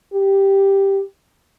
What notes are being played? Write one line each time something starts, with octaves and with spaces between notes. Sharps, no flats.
G4